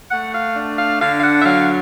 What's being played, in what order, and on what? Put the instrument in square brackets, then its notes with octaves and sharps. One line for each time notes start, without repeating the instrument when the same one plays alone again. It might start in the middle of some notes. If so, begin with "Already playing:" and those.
[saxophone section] A3 F#5
F5
D4
F5
D3 F5
F5
F#5
E5
F#3 F5